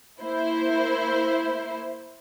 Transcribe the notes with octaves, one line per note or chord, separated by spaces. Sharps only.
A#3 E4 C5